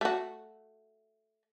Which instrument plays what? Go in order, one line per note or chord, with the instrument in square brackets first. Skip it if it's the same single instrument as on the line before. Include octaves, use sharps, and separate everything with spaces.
[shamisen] A3 F#4